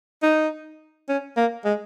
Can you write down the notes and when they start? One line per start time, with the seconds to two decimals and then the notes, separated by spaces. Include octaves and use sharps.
0.23 D#4
1.09 C#4
1.37 A#3
1.65 G#3